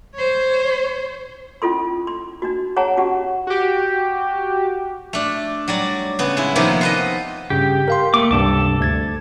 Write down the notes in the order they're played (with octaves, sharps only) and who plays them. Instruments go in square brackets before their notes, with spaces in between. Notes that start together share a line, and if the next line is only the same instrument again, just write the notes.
[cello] C5 C#5
[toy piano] C#4 E4 F4 A4 C6
C6
D4 D#4 F#4
G#4 C#5 F#5 A5 A#5
C#4 F#4 G4 F#5
[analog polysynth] F#4 G4
[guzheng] A3 D4
F#3 G3 D5
C#3 B3
G#3 E4
C3 D#3 F3 A#3 B3
F4 B4 D#5
[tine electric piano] G2 C#3 [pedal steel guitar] G4
[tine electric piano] A#4 F5 C6
[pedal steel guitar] A3 D6 [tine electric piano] A#3
[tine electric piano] C#2 G2 C3 [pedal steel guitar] A4 A5 D6
[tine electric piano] D2 G#6 A6